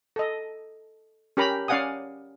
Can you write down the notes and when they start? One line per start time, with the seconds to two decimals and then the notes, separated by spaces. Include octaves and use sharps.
0.16 A4 D#5
1.37 C#4 G4 A#4 A#5 B5
1.68 C#4 D5 F5 F#5 G#5 D#6